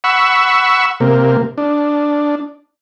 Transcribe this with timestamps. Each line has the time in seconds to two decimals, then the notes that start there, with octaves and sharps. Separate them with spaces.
0.04 F#5 B5 C#6 E6
1.00 C3 A#3
1.58 D4